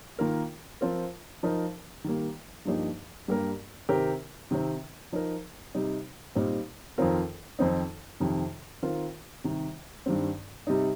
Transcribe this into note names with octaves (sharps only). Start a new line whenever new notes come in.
D#3 A#3 F4 A#4
F3 C4 F4 A#4
F3 D#4 A#4
D#3 G3 A#3
G2 F3 A#3 D#4 G4
G2 G3 A#3 G4 A#4
C3 D#3 C4 G4 A#4
C3 D#3 C4
F3 D#4 A#4
C3 G3 D#4
A#2 G3 C4 D#4
F2 D#3 C4 F4 A#4
F2 D#3 C4 D#4
F2 C3 D#3
D#3 C4 F4 A#4
C3 D#3 G3
G2 D#3 G3 C4
C3 G3 D#4